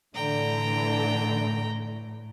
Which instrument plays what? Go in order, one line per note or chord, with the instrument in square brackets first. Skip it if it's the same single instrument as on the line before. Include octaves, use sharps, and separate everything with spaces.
[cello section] A2 [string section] D3 E3 D4 [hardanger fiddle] G5 A#5